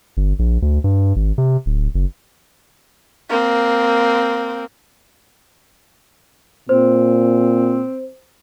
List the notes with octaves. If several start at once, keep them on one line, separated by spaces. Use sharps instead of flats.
G1
A#1
D2
G2
G#1
C3
D1
F#1
A#3 C4
A#2 C4 C5